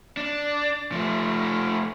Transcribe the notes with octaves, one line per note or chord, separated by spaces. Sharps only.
D4
F3 A3